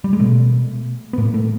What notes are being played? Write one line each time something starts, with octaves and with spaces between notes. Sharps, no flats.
G3
G#3
B2 A3
B3
A2 A#3
A3